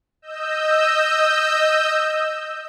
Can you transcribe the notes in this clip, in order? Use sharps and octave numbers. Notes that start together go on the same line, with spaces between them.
D#5 E6 G6